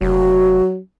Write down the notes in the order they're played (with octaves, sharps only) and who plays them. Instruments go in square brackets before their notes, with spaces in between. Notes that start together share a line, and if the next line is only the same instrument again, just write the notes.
[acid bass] F1 [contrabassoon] F#3 [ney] F#4